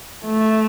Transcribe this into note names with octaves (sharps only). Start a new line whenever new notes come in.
A3